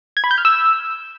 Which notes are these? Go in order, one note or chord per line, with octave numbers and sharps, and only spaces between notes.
G#6
B5
G6
F6
E6